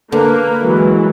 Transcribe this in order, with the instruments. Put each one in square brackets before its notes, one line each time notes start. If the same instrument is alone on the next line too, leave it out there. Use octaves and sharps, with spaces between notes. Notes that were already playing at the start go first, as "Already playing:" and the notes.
[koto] D3 [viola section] A#3 [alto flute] B4
[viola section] E3 F#3 [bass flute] G#3